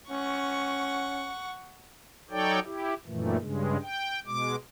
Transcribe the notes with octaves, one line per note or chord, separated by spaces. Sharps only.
C#4 F#5 C#6
F#3 D#4 A4 C#5 D5 G5
E4 G4
F#2 A#2 D#3 E3 A3
G2 C#3 G#3
G5
B2 G#3 D6